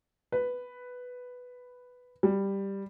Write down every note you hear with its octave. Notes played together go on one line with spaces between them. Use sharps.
B4
G3